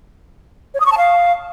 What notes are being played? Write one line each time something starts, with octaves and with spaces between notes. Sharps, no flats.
C#5
D#6
C#6
A5
F5